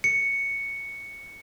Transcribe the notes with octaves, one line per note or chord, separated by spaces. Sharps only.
C#7